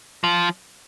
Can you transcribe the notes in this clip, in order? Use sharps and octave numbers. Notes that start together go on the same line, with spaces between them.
F3